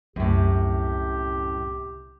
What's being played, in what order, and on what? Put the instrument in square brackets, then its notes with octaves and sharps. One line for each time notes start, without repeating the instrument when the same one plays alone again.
[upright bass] C2 [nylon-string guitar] F#2 A2 [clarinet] G4